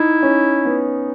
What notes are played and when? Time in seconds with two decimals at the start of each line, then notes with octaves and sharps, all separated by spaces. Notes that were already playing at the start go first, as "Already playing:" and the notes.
Already playing: D#4 E4
0.23 C#4
0.65 B3